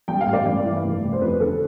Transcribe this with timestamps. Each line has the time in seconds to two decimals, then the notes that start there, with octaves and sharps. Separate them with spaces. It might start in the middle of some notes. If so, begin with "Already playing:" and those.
0.08 G3 G5
0.21 F5
0.26 A1
0.33 D5
0.45 G2
0.64 E3
0.84 F1
1.03 F1
1.13 C5
1.21 F2 B4
1.40 D3 A4